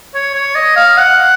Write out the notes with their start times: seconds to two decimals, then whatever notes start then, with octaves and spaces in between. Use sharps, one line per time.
0.15 C#5
0.35 C#5
0.55 D#5
0.76 F5
0.98 F#5